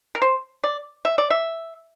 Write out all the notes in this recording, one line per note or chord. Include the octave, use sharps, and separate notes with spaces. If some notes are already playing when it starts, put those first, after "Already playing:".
A#4
C5
D5
E5
D5
E5